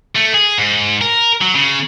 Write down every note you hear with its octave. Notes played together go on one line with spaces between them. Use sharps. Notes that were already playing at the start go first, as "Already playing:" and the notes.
A3
G#4
G#2
A#4
F#3
C#3